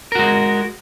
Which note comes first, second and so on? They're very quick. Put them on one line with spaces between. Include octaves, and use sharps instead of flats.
A#4 F#4 G#3